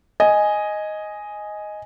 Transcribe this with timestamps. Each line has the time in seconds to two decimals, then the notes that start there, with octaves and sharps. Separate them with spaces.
0.20 D#5 G#5